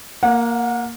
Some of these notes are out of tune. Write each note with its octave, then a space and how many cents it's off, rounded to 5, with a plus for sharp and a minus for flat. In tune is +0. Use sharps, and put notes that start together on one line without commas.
A#3 +0 F#5 -35